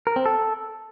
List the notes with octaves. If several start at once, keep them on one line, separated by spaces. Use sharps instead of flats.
A#4
C4
A4